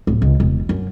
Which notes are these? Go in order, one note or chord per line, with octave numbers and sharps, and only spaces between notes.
D1
C#2
E1
F#2